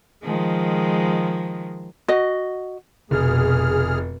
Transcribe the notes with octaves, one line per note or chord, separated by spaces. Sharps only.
D#3 F3 G#3
F#4 D#5
F1 B2 G#4 F6